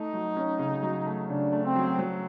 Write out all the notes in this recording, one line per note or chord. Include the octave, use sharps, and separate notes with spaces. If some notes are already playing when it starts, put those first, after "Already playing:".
Already playing: A3 D#4
F#3
C#4
C#3
F#3
A3
C#3 D4
A3
C4
F#3
F#3